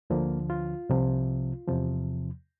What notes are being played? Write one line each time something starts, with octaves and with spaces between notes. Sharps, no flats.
D2 D3 F3 A#3
F4
C2 C3 F3
E2 C3 F3